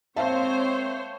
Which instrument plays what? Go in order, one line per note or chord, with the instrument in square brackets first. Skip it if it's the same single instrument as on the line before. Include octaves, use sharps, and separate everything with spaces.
[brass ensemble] G#3 A#3 C4 [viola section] C5 C#5 [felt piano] E5 F5 A5